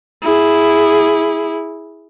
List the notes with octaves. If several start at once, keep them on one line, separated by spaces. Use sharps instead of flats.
E4 G#4